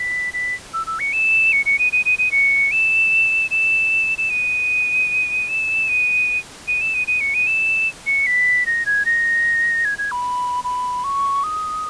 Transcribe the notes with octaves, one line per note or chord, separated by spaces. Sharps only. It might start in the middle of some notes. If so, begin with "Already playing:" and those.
Already playing: B6
B6
E6
E6
C#7
E7
C#7
C#7
D#7
D#7
D#7
D#7
C#7
E7
E7
E7
D#7
E7
D#7
D#7
E7
D#7
D#7
C#7
D#7
E7
C#7
B6
A#6
G#6
A#6
G#6
G#6
B5
B5
C#6
D#6